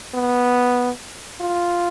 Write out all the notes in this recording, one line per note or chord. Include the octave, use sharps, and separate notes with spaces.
B3
F4